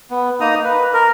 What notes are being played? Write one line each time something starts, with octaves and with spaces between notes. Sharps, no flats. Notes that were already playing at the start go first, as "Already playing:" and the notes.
B3
A#3 D#4 A#5 D#6
B4
A#4